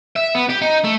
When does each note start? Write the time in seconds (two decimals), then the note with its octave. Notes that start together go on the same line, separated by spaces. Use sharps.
0.16 E5
0.35 B3
0.49 G4
0.62 D#4
0.84 A3